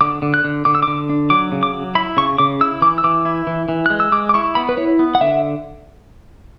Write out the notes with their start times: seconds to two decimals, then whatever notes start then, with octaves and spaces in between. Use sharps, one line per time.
0.01 D3 D6
0.22 D3
0.34 F#6
0.44 D3
0.65 D3 D6
0.75 E6
0.83 D6
0.88 D3
1.09 D4
1.30 F#3 D6
1.52 C#3
1.63 D6
1.73 F#3
1.95 E4 B5
2.17 C#3 C#6
2.38 C#3 D6
2.61 E4 E6
2.82 E3 D6
2.98 E6
3.04 E3 D6
3.25 E4
3.47 E3
3.69 E3
3.86 G#3 F#6
4.00 E6
4.12 G#3 D6
4.29 D6
4.34 E4 C#6
4.55 B3 B5
4.69 B4
4.77 E4 C#5
4.99 B3
5.15 F#5
5.21 D3 E5